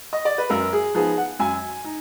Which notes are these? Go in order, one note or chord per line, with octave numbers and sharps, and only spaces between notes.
D#5
D5
B4
F#2 A#4
G#4
F3 B3 D#4 G#4
F#5
F#2 G#5
D#4